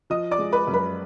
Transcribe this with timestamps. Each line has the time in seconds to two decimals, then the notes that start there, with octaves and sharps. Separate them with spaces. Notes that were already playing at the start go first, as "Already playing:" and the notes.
0.10 F3 D#5 D#6
0.31 D5 D6
0.39 G#3
0.53 B4 B5
0.67 F#2
0.74 B4 B5